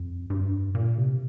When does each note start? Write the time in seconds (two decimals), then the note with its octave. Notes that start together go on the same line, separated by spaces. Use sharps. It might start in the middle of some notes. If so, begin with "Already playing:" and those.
Already playing: F2
0.30 G2
0.75 A#2
0.97 C3